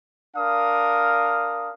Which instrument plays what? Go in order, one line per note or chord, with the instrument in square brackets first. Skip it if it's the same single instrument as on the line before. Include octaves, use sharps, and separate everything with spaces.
[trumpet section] D4 A#4 F5 D#6